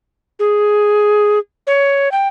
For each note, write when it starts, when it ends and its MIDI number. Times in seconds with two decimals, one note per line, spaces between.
0.39 1.39 68
1.67 2.12 73
2.12 2.28 79